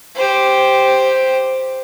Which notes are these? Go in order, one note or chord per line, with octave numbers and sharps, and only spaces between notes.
G4 C5